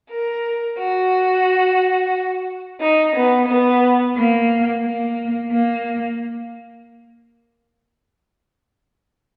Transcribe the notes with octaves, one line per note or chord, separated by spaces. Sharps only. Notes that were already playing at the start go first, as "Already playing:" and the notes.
A#4
F#4
D#4
B3
B3
A#3
A#3
A#3